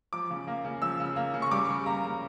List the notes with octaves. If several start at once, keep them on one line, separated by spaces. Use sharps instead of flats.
F3 D6
C#3
A#3
C#3
F3 E6
C#3
A#3
C#3
C#6
G3 D6
C#3
A#3 A#5
C#3